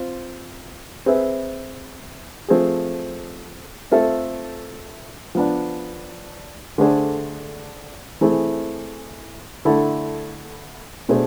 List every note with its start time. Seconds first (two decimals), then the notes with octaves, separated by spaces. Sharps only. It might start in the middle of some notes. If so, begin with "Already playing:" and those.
Already playing: C4 F4
1.06 C4 G#4 B4 E5
2.48 F3 A3 C4 G#4
3.92 A3 C4 F4 A4 E5
5.35 F3 B3 D4
6.78 D3 A3 D4 G#4 C5
8.21 E3 A3 C4 E4 G#4
9.65 D3 A3 E4 A4
11.09 B2 A3 D4 G#4 C5